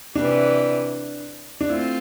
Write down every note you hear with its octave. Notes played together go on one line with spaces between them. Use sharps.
C3 E3 G3 D4
D4
A3 C4 E4 F4